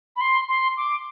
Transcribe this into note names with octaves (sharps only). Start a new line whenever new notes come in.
B5
C6
C6
D6